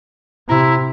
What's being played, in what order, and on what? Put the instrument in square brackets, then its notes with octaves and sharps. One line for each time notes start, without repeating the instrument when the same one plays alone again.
[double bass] C3 [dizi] E4 [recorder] A#5